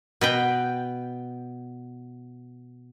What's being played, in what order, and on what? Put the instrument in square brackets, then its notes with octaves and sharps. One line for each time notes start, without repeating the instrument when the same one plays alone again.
[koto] B2 B4 G5